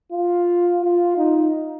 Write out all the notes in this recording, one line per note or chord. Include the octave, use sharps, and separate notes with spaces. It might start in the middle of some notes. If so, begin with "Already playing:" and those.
F4
F4
D#4